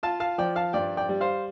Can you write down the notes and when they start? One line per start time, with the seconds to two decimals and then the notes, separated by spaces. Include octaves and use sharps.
0.03 F4 F5 A5
0.20 F5 A5
0.38 F3 D5 G5
0.56 F5 A5
0.73 G2 D5 G5
0.97 D5 G5
1.09 G3
1.21 C5 F5